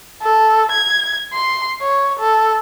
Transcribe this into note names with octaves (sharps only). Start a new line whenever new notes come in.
A4
G#6
C6
C#5
A4